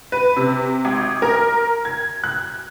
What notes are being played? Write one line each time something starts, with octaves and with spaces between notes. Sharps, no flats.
B4
C3
G#1
A#4
G#6
F#6